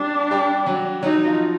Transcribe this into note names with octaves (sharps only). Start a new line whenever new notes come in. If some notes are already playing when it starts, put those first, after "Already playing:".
Already playing: G3 D4 G4
G3 G4
F#3 F#4
F#3 D#4 F#4
F3 F4